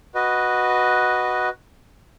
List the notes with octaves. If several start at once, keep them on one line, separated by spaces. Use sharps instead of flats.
F#4 B4 D#5